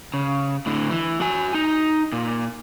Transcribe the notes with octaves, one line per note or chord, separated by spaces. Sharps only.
C#3
A2 D3
E3
F#4 G#5
D#4
A#2